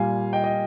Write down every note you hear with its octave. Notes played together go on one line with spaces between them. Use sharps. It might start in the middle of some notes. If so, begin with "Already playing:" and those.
Already playing: A#2 G3 F5 G#5
D#5 G5
D#5